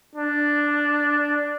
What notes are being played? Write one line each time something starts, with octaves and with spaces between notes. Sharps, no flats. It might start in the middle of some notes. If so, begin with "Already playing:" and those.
D4